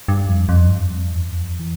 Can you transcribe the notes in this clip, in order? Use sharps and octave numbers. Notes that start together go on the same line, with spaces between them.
G2
F2
F2
G2
F2
E2
F2
E3